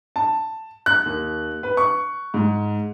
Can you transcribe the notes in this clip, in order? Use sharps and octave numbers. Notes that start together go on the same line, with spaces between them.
A5
F#6
D#2
B4
C#6
G#2